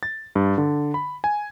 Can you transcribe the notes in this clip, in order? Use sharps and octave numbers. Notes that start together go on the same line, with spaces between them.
A6
G2
D3
B5
G#5